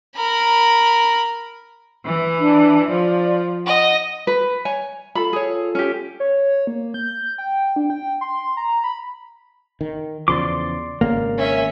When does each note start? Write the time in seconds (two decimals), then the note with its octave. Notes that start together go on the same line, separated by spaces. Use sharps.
0.16 A#4 B5
2.05 E3
2.39 D4
2.88 F3 D5
3.65 D#5 F#5
4.27 B4
4.65 C#5 G#5
5.15 F4 A4 B5
5.33 G#4 C#5
5.75 C#4 G4
6.20 C#5
6.67 A#3
6.94 G6
7.38 G5
7.76 D4
7.90 G5
8.21 C6
8.57 A#5
8.84 B5
9.81 D#3
10.28 E2 C#3 F3 D5 C6 D6
11.01 G#1 C#3 A#3
11.38 C#4 E5